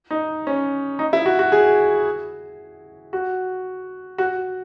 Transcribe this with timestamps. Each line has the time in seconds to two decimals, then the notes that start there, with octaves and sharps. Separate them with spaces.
0.11 D#4
0.47 C#4
0.99 D#4
1.13 E4
1.26 F#4
1.39 F#4
1.52 G#4
3.13 F#4
4.18 F#4